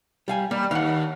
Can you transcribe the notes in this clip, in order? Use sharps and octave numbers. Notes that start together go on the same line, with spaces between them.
G3 F5 G#5
G3 A#3
D#2 F5 F#5